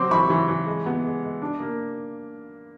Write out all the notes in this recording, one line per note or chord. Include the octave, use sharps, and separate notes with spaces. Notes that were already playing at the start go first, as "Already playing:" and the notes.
Already playing: F#3 C4 C6 D6
E3 B5 C#6
E3
E3
G#3
B3
G#3
G#3
D4
A#3